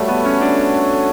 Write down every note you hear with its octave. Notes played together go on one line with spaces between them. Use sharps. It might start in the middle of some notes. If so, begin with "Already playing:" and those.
Already playing: G3 A3 F#4 A4 C#5
B3
C#4
D4